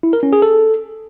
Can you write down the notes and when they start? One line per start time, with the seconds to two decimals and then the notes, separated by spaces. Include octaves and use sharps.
0.03 E4
0.13 A#4
0.23 C#4
0.33 G#4
0.42 A4